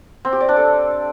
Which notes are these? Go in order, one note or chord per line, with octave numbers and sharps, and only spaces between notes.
C4
G4
D5
D4
A4